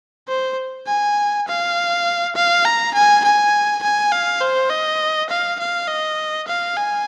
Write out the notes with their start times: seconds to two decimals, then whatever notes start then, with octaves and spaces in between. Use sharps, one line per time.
0.28 C5
0.87 G#5
1.47 F5
2.35 F5
2.65 A#5
2.94 G#5
3.24 G#5
3.83 G#5
4.12 F5
4.41 C5
4.70 D#5
5.29 F5
5.59 F5
5.88 D#5
6.48 F5
6.76 G#5